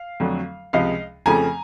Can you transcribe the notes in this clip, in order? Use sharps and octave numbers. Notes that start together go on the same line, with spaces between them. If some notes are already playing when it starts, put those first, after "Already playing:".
Already playing: F5
F2 D3 F#3 A3
C#2 C3 F3 G#3 D#5 F5
F2 C#3 F3 A3 G#5 A#5